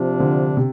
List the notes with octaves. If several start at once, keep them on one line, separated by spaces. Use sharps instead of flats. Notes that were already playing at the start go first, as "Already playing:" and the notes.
Already playing: C3 F3 D4
D3
C3